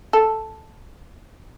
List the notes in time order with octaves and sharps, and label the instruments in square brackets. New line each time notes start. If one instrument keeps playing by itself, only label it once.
[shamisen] A4